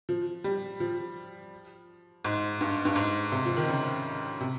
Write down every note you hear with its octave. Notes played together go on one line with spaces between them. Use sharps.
F3
G3
F3
G#2
G2
G2
G#2
C3
F3
D#3
C#3
C3